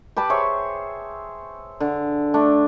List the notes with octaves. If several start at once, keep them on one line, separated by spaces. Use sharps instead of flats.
G4 B4 A5 B5
G#4 C5 C#5 E5
D3
A3 D4